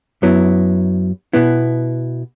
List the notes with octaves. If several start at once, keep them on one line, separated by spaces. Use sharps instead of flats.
F#2 F#3 B3 E4
B2 B3 E4